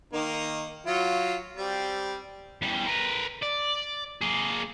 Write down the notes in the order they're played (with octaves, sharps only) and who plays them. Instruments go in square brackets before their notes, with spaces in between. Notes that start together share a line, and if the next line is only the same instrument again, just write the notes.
[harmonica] D#3 A#3 D#4
F#3 F4
G3 C4
[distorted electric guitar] E2 G3
A#4 B4
D5
A#3 G#4